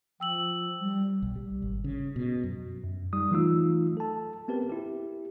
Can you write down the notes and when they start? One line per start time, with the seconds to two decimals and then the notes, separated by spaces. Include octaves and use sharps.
0.20 F3 G5 E6 F#7
0.80 G3
1.22 B1
1.36 G3
1.62 G#1
1.84 C#3
2.16 B2
2.44 F#2
2.84 F#2
3.13 G3 D#4 D#6
3.31 E3 F#3 A3 D#4 F4 E6
3.97 A4 A5
4.48 B3 C4 G4 A#4 B4
4.70 E4 G4